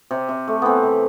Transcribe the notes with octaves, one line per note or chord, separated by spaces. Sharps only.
C3
C3
A3
E3 B3 C4
C3